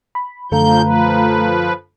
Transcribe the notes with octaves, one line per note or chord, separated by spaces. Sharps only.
B5
F#2 D3 F3 A3 A4 F5 A#5 G6
F3 B4